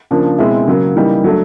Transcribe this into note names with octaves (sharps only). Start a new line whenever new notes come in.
C#3 F3 A#3 D4
B2 G#3 C4 E4
C#3 F#3 A#3
C#3 E3 G3 A#3 D#4
F#3 A3 D4